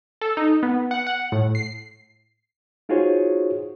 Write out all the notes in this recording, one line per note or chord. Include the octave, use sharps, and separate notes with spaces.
A4
D#4
B3
F#5
F#5
A2
C7
D#4 F4 F#4 G#4 C5 C#5